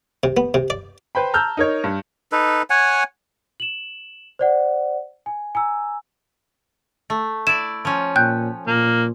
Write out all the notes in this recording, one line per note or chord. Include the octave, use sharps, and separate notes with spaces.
C3
B3
C3
D5
B4 C5 G5 B5
A5 A#5 E6 F6 G6
D#4 A#4 C#5
G2
D#4 A4 B4
C#5 F#5 G#5
E7 F#7
C5 D5 F#5
G#5
G#5 A#5 E6
A3
E4 D5 E7
F3 C#4
A#2 G5 F#6 G6
A#2 A#3